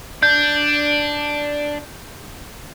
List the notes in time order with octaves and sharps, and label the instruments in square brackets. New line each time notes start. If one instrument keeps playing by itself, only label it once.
[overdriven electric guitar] D4 [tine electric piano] G6